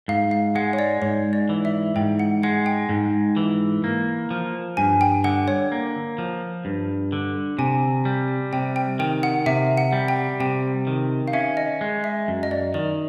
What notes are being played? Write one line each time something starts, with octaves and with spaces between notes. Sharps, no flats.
G#2 F5
F5
G#3 F#5
C#5
D5
G#2 C#5
D5
E3
E5
G#2 G5
F#5
G#3 F#5
G5
G#2
E3
A#3
F3
G2 G#5
G5
D3 F#5
C#5
A#3
F3
G2
D3
C3 G#5
G3
C3 G5
G5
D#3 G5
F#5
C3 E5
F#5
G3
G5
C3 G5
D#3
F5
C#4 E5
D#5
G#3
E5
F#2
D#5
D5
D#3 D5